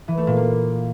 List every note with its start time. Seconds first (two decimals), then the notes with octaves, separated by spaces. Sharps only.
0.08 E3
0.17 A3
0.27 A#2
0.37 A#3